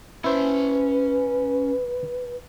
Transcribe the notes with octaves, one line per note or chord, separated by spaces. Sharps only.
C#4 E4 B4 C5 A5